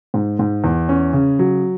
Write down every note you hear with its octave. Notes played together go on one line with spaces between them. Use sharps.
G#2
G#2
E2
C#4
C#3
F#3